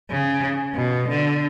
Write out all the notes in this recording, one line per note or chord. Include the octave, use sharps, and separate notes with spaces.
C#3
B2
D3